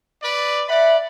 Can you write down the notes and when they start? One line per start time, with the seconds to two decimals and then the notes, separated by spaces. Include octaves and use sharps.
0.22 B4 D5
0.69 D5 E5 F#5 B5